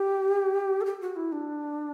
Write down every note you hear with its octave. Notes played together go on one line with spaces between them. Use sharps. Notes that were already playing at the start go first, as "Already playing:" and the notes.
Already playing: G4
A4
G4
F#4
E4
D4